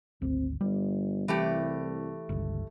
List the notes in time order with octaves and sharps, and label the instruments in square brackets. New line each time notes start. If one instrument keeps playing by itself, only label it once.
[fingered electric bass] G#1 D2 [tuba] C4
[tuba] G1 [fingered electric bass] G3
[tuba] C2 [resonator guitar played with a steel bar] E3 A3 G4
[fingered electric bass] G1 C#2